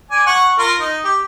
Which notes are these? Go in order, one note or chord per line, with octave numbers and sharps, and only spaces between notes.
D5 G#5
F#5 C#6
F4 A#4
D#4
G4